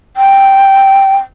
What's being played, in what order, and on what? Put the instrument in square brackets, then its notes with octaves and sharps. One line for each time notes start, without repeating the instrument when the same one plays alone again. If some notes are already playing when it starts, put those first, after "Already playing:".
[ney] G5